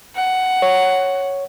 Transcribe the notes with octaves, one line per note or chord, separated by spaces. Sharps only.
F#5
C#5